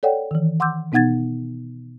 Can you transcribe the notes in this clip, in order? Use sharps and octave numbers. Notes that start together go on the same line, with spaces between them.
A4 C#5 D5 F#5 G5
D#3 E3
F#5 C6 D6 E6 G6
B2 B3 D#4 F#5 G#6 A6